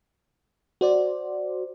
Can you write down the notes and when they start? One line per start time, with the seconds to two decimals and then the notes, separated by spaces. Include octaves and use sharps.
0.81 F#4 C5 D5